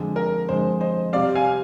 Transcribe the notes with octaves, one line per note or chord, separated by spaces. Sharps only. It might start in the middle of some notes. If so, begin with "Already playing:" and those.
Already playing: F2 D3 G#3
A#4
F2 D3 G#3 C5
C5 D#5
C3 G3 C4 D5 F5
F5 G#5